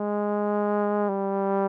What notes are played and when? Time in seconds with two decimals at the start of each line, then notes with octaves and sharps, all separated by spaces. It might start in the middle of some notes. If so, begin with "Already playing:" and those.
Already playing: G#3
1.09 G3